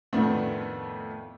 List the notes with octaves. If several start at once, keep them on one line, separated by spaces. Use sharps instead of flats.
F2 A2 D#3 A3 B3 D4